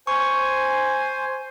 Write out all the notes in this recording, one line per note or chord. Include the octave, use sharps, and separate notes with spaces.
C5 G#5 C#6